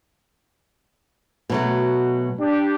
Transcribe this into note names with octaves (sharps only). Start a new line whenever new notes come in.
B2 F#3 A3
D4 G4